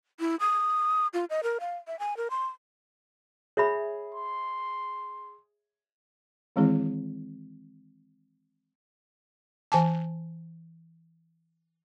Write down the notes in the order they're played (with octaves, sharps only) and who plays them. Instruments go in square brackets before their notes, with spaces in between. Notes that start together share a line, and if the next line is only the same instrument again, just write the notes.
[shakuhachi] E4
D#6
F4
D#5
A#4
F5
E5
G#5
A#4
C6
[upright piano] G#4 [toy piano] C#5 E5 B5
[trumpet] C6
[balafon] D#3 E3 G#3 C4 E4 G#4
E3 G#5 A5